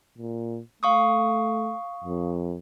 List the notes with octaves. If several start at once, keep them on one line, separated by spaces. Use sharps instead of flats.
A#2
A3 F5 C#6 D#6
F2